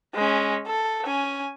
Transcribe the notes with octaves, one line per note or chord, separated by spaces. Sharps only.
G#3 C#4
A4
C#4 G#5